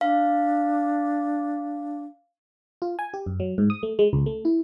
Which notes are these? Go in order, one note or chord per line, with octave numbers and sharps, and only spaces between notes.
D4 F5
F4
G#5
G4
F#2
F#3
G#2
D#6
A3
G#3
C#2
A3
E4